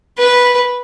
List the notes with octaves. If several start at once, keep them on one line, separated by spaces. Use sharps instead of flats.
B4